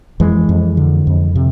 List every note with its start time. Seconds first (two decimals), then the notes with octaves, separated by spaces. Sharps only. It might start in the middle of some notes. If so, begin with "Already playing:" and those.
0.20 F2 E3 G#3
0.49 F2
0.77 D3
1.07 F2
1.36 C3